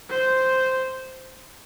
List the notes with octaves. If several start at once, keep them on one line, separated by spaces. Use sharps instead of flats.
C5